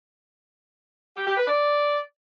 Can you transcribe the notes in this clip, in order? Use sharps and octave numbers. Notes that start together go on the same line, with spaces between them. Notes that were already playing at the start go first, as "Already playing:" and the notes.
G4
G4
B4
D5